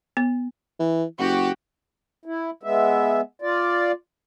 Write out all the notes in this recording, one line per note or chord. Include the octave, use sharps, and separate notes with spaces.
B3
E3
F#1 F#4 G4
E4
G#3 B3 E5
F4 D5